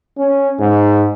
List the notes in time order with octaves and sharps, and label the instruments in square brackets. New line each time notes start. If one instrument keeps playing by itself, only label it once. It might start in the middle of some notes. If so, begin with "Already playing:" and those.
[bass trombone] C#4
G#2